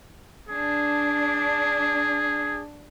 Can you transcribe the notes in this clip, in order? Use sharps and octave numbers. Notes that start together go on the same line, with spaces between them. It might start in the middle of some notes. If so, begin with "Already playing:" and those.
D4 G#4